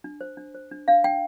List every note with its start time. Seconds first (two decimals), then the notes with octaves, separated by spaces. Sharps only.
0.04 D4
0.21 C5
0.37 D4
0.54 C5
0.71 D4
0.88 D4 F5
1.04 D4 G5